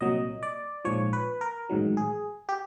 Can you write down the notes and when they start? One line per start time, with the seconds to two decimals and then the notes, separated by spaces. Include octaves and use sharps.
0.01 C2 A#2 F#3 D#5
0.43 D5
0.85 A#1 G#2 F3 C#5
1.13 B4
1.41 A#4
1.69 A1 G#2 D#3 F#3
1.97 G#4
2.49 G4